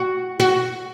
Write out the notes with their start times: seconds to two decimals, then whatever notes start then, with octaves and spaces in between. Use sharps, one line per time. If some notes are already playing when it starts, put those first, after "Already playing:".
Already playing: F#4
0.40 F#4